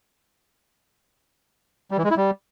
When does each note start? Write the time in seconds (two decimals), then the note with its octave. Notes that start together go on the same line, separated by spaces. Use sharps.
1.91 G3
1.98 E3
2.04 G#3
2.11 E4
2.17 G3